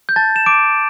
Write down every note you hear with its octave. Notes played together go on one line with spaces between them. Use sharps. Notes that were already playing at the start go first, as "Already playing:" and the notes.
G6
A5 A6
E7
D6 D7